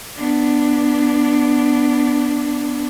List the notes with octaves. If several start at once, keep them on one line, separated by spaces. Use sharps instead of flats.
B3 D4